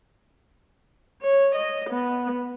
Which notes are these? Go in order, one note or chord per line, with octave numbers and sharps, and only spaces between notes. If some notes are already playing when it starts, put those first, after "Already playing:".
C#5
D#5
B3